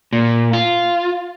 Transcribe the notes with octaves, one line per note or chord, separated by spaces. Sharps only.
A#2
F4